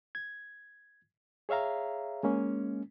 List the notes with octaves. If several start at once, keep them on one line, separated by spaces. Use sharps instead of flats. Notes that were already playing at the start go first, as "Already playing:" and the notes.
G#6
G#4 C#5 E5 F5 A#5
G#3 A#3 C#4